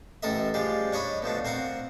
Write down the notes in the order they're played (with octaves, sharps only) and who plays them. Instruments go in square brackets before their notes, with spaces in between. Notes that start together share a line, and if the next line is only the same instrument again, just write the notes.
[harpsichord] A1 A2 A4 A#4 D#5 E5
F3 G3 G#3 G4
D4 C#5 D#5 B5
B2 F3 A3 D4
C4 A#4 F5 F#5